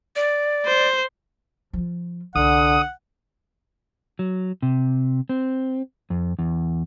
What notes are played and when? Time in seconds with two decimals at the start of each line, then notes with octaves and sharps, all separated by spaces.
0.16 D5
0.66 C5
1.73 F3 F4
2.36 C2 D3 F#5 D#6
4.19 F#3
4.62 C3
5.29 C4
6.10 F2
6.39 E2